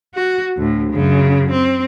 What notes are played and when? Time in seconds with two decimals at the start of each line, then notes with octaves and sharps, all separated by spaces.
0.15 F#4
0.57 D2 A2
0.92 F#2 C#3
1.51 C4